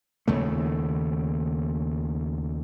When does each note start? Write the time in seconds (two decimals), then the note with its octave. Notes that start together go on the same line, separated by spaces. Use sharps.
0.28 D#2 C#3 A3